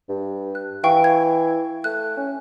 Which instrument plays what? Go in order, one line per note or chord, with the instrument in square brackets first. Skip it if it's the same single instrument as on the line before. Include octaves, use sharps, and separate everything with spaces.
[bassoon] G2
[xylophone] F#6
[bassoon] E3 [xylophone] F5 G5 C#6
[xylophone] G#6
[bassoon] A3 [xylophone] F#6
[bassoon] C#4